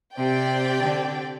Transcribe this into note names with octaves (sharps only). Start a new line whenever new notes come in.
C3 C4 G4 D5 G5
D3